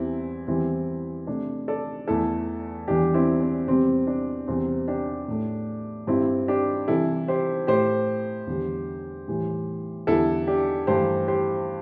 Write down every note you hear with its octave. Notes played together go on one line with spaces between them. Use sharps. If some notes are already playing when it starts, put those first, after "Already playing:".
Already playing: E2 E3 G3 C4 E4
E2 E3 G3 C4 E4
C3 A3 D4
A4 D5
E2 E3 A3 E4 A4
E2 E3 G3 D4 G4
C4 E4
C4
E2 C3 G3 C4
D4
E2 C3 G3 C4
D4 G4
A2 A3
G2 G3 C4 E4
D4 G4
C3 E3 G3 E4 A4
G4 C5
A2 A3 G4 C5
E2 D3 G3
A2 E3 G3
E2 D3 G3 E4 A4
D4 G4
G2 E3 A3 G4 C5
G4 C5